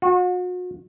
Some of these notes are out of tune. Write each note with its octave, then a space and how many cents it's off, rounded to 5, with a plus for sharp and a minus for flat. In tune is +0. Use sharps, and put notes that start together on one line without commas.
F#4 -40